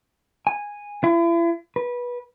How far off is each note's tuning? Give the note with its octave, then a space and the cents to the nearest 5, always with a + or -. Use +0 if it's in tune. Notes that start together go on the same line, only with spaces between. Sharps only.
G#5 -10
E4 +40
B4 -20